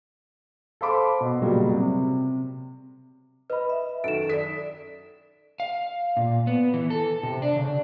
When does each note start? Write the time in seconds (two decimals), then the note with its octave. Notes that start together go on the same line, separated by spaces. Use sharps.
0.81 A4 C5 F5 B5 C6 D6
1.21 B2
1.40 A#2 C#3 F#3 G3
1.73 C3
3.50 B4 D#5 B5
3.70 E5
4.04 F#2 D#3 A4 D7 E7
4.29 A4 D5 B6
5.60 F5
6.17 A#2
6.47 B3
6.74 E3
6.90 A4
7.23 C3
7.42 D4
7.56 C#3